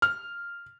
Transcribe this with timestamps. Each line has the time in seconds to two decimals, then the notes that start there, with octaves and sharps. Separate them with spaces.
0.02 F6